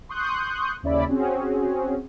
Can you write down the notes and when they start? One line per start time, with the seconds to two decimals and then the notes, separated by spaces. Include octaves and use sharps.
0.09 C6 C#6 D#6 F#6 G6
0.83 D#2 C#3 E4 D5 B5
1.08 C4 C#4 F#4 G#4